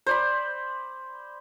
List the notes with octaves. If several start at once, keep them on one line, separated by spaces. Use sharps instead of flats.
C5 D5 B5